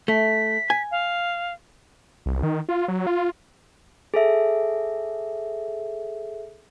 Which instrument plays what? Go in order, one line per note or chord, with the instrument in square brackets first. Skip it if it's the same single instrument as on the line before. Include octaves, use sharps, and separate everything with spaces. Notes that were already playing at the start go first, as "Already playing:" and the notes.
[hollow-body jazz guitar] A3 [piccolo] B6
[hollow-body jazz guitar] G#5
[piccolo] F5
[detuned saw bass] C2
D#3
F4
F#3
F4
[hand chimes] G#4 A4 E5